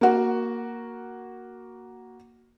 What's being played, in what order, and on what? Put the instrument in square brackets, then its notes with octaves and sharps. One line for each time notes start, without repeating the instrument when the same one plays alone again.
[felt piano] A#3 F#4